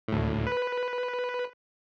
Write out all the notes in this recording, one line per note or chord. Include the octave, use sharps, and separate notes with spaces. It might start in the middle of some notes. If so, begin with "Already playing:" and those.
D2 A2
B4